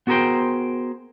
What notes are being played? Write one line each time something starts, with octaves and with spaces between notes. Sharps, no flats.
B3 F#4 G#4 A#4 C5 G5